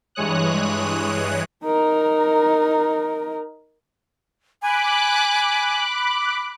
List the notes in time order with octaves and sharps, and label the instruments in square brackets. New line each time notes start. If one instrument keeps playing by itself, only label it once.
[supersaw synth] G2 E3 G#3 C#5 D#6 F#6
[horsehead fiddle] D#4 A#4
[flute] G#5 [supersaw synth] B5 D6 F#6